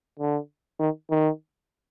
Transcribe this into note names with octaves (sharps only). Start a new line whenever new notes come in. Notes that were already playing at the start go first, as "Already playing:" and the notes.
D3
D#3
D#3